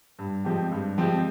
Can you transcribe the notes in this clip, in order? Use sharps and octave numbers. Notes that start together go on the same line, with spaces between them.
G2
F3 G#3 C4 G4
G2
F3 G#3 C4 G4